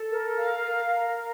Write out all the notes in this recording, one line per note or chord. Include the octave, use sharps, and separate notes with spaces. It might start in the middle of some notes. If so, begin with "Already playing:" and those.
Already playing: A4
A#4
F5
A#4
A#4